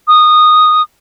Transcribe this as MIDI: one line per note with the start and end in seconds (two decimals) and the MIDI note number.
0.08 0.82 87